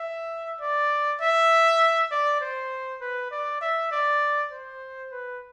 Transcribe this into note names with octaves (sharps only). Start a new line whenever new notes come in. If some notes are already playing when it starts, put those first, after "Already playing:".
Already playing: E5
D5
E5
D5
C5
B4
D5
E5
D5
C5
B4